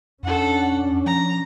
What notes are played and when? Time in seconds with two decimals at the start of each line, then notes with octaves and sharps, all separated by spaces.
0.23 F2 C#4 D4 A4 F#5
1.06 F3 A#5